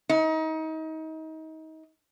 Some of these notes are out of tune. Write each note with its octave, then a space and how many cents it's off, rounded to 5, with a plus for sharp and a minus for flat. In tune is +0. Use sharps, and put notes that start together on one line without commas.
D#4 +30